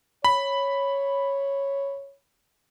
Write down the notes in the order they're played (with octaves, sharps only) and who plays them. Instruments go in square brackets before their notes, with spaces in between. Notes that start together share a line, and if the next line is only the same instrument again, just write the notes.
[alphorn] C#5 [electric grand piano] B5